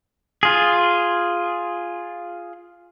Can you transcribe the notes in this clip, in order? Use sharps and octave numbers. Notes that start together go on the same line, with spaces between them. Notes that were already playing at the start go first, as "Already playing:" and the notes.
F4 G#4